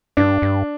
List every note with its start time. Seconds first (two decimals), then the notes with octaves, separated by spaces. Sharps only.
0.17 G2 D4
0.42 G2